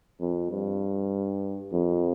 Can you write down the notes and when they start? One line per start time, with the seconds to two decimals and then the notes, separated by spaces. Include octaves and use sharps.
0.20 F2
0.51 G2
1.73 F2